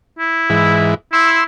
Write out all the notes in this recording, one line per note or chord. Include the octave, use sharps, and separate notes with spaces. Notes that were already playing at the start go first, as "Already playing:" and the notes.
E4
G#2 E3
E4 C6 E6